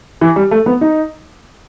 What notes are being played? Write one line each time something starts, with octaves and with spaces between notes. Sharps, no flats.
E3
G3
A3
B3
D#4